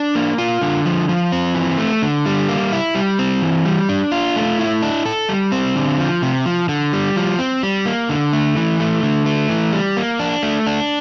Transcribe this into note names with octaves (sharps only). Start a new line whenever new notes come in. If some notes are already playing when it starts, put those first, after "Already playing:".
Already playing: D4
A#3
F4
D3
F3
F3
C4
E3
A3
D3
G3
A#3
E4
G3
C4
E3
G3
D4
F4
A3
E4
D4
A4
G3
C4
D3
F3
C3
F3
D3
G3
F3
C4
G3
A#3
D3
A3
E3
A3
D3
A3
E3
G3
A#3
D4
A3
D4